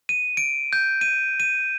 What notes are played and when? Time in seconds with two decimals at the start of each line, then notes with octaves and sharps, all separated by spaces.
0.09 D#7
0.37 D7
0.73 G6
1.01 D#7
1.40 D#7